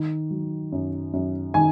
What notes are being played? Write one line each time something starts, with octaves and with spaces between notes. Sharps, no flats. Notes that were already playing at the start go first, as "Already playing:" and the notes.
Already playing: D#3
F#3
F#2
F#2
D#3 G#5